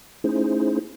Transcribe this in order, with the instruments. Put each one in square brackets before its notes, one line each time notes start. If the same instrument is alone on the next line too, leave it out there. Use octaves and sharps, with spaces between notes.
[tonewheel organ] A3 C#4 D#4 E4 G#4 C5